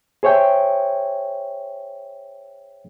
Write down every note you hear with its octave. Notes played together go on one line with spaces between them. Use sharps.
G#4 C5 C#5 E5 G5